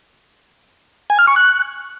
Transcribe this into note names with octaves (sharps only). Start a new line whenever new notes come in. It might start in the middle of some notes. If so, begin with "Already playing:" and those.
G#5
F6
C#6
F#6